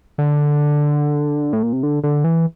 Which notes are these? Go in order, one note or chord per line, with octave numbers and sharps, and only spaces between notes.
D3
A2
A#2
C3
D3
D3
E3